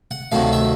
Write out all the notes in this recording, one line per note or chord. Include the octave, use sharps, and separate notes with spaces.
F#5
D2 C3 D#3 F#3 F5
E5